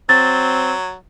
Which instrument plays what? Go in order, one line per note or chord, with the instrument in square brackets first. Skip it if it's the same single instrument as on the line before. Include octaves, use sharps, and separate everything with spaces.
[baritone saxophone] F#3 [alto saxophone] C4 [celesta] A6